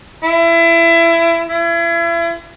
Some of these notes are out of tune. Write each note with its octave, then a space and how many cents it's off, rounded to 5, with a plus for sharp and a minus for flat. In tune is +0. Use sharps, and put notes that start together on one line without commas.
E4 +25
E4 +40